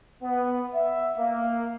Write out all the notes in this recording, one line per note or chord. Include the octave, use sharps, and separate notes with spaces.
B3
E5
A#3